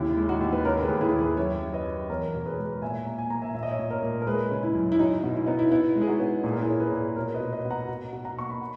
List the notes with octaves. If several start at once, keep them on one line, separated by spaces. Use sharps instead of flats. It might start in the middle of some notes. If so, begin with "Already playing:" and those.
Already playing: D#2 C#3 E4
G#3
D#4 F#4
D#2
B4
C#3 A#4 C#5
G#4 B4
D#2
E4 G#4
D#2
G#4 B4
F#2 C#5 E5
F#2
B4 D#5
F#2
E2 A#4 C#5
B2
G#4 B4
G#3
A#2 E5 G#5
A#3
G#5
A#3 A#5
E5 G#5
A#2 E5
D#5
C#5 E5
A#2
A#4 C#5
A#2
A#4
G#3 G#4 B4
C#3
E4
F#2
E4
F#3 D#4
B2
E4
B3 D#4
E4
B3 E4
G#3
G#4
D#4 F#4
B3
A#2 G#4
A#4
E4 G#4
C#4
G#4 B4
A#2
B2 A#4 C#5
B4 D#5
B2
B4 D#5
B2
F#5 A#5
B2
B2
F#5 A#5
A#3 C#6
B5
F#5